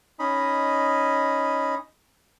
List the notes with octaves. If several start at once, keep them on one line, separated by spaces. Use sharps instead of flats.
C#4 D#4 D#5 B5